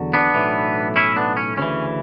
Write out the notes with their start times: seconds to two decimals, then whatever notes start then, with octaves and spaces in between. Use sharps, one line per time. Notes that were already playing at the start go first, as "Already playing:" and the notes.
Already playing: E2 D3 F#3
0.13 B3 D4
0.34 B1 A2 E3
0.96 C#4 E4
1.16 B3 D4
1.37 C#4
1.57 D2 C#3 E3 C#4